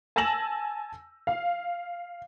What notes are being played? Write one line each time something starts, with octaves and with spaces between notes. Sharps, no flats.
G#5 A5 E6 A#6 E7 F#7
F5